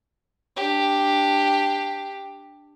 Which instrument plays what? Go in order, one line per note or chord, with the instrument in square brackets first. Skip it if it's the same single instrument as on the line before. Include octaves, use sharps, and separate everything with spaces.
[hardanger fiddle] D4 G4